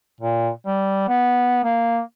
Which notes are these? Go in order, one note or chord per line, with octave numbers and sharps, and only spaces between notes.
A#2
G3
B3
A#3